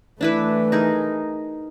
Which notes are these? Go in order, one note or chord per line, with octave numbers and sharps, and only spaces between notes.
E3 A3 D4 E4 B4
D#4 G#4 A#4